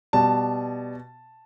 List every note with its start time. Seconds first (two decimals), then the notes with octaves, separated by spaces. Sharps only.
0.13 B2 G3 A5